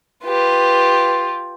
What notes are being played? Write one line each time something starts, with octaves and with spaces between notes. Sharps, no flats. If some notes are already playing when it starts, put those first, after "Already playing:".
F4 G4 B4